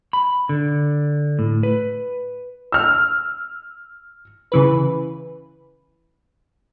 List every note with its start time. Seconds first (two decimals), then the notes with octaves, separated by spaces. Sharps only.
0.13 B5
0.49 D3
1.39 A2
1.63 B4
2.72 E6 F6
4.52 C#3 E3 B4